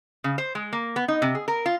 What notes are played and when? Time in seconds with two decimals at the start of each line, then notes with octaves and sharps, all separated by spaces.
0.24 C#3
0.38 C5
0.55 G#3
0.73 A#3
0.96 B3
1.08 D#4
1.22 C3
1.35 G#4
1.48 A#4
1.66 F4